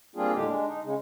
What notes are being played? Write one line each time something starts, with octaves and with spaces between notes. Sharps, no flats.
G3 A#3 C4 D4 F4 G#4
D#2 A2 D3 G#3 G4
G#3 D4
D#4
C#3 G#3